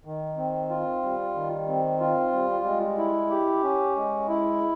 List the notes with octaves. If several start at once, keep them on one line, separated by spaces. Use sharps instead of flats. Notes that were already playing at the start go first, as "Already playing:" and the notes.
D#3
C4
F4
G3
D#3
C4
F4
G3
G#3
E4
G4
C#4
G#3
E4